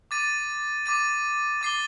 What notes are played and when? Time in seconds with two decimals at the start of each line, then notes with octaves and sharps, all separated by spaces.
0.11 D6 A6 D#7
0.86 D6 A6 D#7
1.61 D6 A6 C7 G7